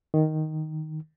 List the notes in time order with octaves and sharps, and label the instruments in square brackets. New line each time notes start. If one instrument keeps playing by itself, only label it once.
[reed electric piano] D#3